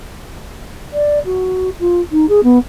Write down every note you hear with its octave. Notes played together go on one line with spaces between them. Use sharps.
D5
F#4
F4
D#4
G#4
B3